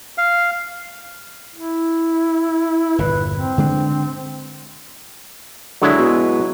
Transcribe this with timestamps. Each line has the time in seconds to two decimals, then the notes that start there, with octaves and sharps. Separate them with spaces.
0.18 F5
1.55 E4
2.98 G1 E2 A#2 B4
3.34 C4
3.58 D3 G#3 D4
5.82 D3 F#3 G#3 E4
5.98 B2